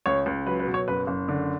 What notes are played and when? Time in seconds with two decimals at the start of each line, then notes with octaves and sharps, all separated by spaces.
0.06 C#2 C#5
0.26 C#2
0.47 F#3 B4
0.60 B4
0.67 B2
0.74 C#5
0.88 F#1 B4
1.07 F#1
1.28 D3